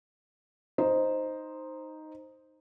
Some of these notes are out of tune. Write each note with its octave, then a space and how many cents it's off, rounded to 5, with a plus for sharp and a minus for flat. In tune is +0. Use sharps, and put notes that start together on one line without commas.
D#4 +0 C5 +0